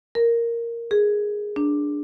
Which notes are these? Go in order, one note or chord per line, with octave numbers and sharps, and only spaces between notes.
A#4
G#4
D4